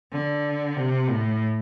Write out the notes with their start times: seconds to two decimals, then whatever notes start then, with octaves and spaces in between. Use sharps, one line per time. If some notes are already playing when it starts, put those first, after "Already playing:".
0.12 D3
0.76 C3
1.09 A2